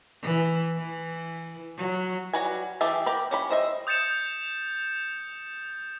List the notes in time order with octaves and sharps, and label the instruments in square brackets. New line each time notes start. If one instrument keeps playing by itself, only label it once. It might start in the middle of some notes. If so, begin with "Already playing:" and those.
[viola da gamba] E3
E3
F#3
[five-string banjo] F#3 G3 F#4 B4 G#5
E3 G4 G#4 E5 A5
G4 A#4 B5
C#4 G4 B5
C5 D#5 E5
[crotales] D#6 G6 A6 C#7 E7 F7